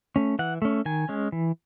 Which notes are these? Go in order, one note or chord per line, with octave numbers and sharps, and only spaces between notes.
A3 C#4
E3 F#5
A3 C#4
D#3 G#5
G#3 C#4
E3